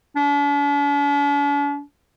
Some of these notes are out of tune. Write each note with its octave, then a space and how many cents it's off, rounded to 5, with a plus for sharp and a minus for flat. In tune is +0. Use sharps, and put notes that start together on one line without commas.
D4 -45